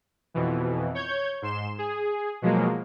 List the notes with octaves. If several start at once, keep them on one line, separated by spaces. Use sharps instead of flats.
F2 B2 E3
C#5 G6 G#6
G#2 C6 E7
G#4
B2 F3 F#3 G#3 A#3